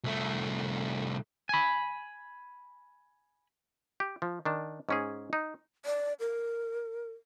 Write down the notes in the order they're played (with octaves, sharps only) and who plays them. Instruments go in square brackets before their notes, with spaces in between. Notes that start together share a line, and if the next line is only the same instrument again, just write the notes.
[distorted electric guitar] C2 A3
[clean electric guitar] G#5 B5
[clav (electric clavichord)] G4
F3
D#3 D4 A5
G#2 C#4 G#4
D#4
[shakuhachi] D5
A#4